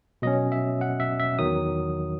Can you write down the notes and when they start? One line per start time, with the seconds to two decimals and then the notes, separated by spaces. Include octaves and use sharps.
0.22 B2 F#3 C#4 D#5
0.52 E5
0.81 F#5
1.00 E5
1.20 E5
1.39 E2 D#3 F#3 D#6